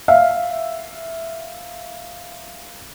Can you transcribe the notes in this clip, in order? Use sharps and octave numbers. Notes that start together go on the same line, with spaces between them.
E5 F5